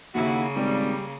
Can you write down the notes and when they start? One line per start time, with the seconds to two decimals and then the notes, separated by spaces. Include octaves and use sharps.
0.15 D#2 C#3 A#3 E4 F#4
0.56 G#1 G3